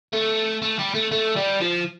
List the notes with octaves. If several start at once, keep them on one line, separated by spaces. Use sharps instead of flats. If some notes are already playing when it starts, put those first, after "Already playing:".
A3
A3
G3
A3
A3
G3
F3